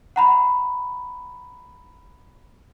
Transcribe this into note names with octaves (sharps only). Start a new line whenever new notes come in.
F#5 A#5 B5